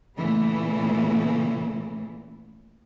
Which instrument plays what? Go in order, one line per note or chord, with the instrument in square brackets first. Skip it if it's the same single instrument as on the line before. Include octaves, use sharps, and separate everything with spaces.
[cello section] A#2 C#3 E3 A3 B3